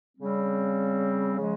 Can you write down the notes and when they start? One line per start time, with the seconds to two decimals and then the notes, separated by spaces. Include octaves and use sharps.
0.17 C#3 G3 C4
1.37 C#3 F3 G#3